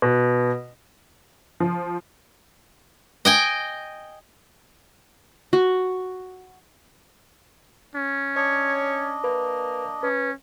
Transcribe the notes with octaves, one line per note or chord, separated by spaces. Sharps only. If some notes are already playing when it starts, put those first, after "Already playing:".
B2
F3
D#5 G5 G#5
F#4
C#4
D4 C#5 D#5
A#3 B4
C#4 B4